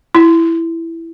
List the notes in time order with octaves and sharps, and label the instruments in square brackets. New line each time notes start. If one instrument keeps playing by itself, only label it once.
[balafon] E4